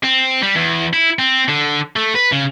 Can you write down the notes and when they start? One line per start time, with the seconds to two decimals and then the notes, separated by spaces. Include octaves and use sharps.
0.04 C4
0.43 G3
0.56 E2
0.93 E4
1.19 C4
1.48 D3
1.96 A3
2.15 B4
2.32 C#3